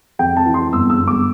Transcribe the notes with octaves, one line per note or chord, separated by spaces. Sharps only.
F2 G5
A5
E3
C6
G1 E6
E6
G1
D6